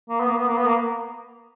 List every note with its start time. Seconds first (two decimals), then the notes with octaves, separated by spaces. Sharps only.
0.09 A#3
0.20 B3
0.28 A#3
0.38 B3
0.48 A#3
0.58 B3
0.67 A#3